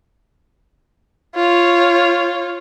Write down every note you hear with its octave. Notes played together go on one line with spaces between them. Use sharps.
F4 C#5